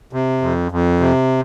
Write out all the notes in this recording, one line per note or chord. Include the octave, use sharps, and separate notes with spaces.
C3
F2
F2
C3